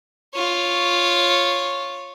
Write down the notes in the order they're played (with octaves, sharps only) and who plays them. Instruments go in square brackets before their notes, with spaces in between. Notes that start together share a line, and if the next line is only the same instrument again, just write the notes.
[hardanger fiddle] F4 C#5